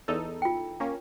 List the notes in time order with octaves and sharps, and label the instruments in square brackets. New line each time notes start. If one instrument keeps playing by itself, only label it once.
[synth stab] E2 D#4 A4
[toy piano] F4 G5
[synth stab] A#3 C#4